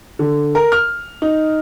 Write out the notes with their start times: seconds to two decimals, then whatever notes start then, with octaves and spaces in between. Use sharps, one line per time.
0.19 D3
0.55 A#4
0.72 F6
1.22 D#4